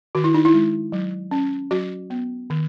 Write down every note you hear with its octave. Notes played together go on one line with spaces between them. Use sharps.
D#3 F#4
E4
D#4
E4
G#3
F#3
C#4
F#3 F#4
B3
D#3